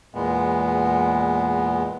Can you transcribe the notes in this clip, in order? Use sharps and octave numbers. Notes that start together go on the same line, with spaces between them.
E2 A#2 G#3 B3